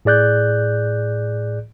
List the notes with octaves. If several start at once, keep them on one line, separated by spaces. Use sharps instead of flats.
A2 G#4 D5 F#6 G6